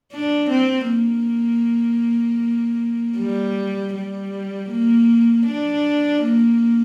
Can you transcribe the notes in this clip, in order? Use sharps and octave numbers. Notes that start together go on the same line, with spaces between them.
D4
C4
A#3
G3
G3
A#3
D4
A#3